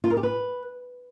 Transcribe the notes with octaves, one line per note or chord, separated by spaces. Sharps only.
F4
A#4
G4
B4